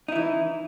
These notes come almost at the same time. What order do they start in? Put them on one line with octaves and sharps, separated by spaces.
D#4 E4 E3